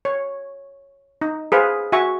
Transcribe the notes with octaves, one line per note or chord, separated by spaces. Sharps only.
C#5
D#4
G#4 B4 C5 F5
F#4 E5 G#5 C#6